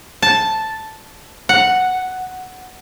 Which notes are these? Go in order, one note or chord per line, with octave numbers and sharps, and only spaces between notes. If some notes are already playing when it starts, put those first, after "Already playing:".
A5
F#5